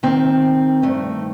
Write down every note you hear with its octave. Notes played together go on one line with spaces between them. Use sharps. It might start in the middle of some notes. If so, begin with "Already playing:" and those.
F2 D#3 C4
G2 D#3 A3